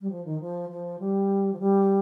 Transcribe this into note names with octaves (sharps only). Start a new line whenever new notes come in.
G3
F3
D#3
F3
F3
G3
F3
G3